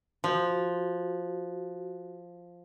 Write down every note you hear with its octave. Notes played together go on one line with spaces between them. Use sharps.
F3 F#4